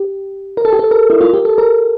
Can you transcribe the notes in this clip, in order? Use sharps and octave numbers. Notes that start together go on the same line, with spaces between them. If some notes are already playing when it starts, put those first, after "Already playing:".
Already playing: G4
A#4
A4
G4
A4
A#4
E4
F4
G4
A4
A#4